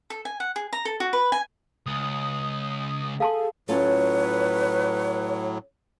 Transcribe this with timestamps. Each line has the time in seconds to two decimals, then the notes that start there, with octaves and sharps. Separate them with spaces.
0.10 A4
0.25 G#5
0.40 F#5
0.56 G#4
0.73 A#5
0.85 A4
1.00 F#4
1.13 B4
1.32 G#5
1.86 C#2 D#6
3.20 G#4 A4 F5 A5 C6
3.69 A2 F#3 C#4 F4 A4 B4 C#5